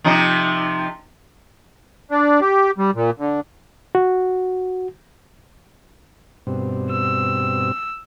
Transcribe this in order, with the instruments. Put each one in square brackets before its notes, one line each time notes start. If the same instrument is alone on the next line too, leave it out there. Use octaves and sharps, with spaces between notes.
[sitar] C3 F3 D#4
[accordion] D4
G4
G3
A#2
D3
[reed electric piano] F#4
[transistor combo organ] G2 B2 C4
[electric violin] E6